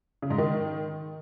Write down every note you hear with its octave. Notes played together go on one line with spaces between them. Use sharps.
C#3
G#2
D#3